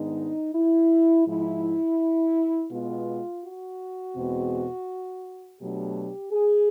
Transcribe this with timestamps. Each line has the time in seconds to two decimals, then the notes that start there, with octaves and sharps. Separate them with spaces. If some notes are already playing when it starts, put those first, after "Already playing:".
Already playing: G#2 D#3 G#3 B3 D4 D#4
0.55 E4
1.26 G#2 F3 G#3 E4
2.71 B2 G#3 B3 F4
3.43 F#4
4.16 E2 B2 G#3 C4
5.60 B2 F#3 A3 D4 G4
6.32 G#4